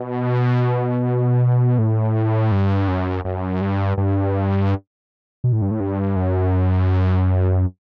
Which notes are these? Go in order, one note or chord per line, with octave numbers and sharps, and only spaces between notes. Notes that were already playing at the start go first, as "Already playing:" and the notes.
Already playing: B2
A2
G2
F#2
F#2
G2
G2
B2
A2
G2
A2
G2
F#2